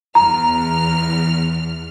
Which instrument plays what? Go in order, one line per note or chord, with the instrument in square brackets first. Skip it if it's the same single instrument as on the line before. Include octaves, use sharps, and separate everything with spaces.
[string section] E2 F6 [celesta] A#5